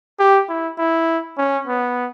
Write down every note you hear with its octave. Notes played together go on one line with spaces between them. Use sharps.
G4
E4
E4
C#4
B3